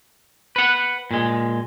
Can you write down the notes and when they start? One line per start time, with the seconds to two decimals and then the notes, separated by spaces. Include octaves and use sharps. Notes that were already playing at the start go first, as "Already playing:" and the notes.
0.56 B4 F#5
1.11 A#2 G#3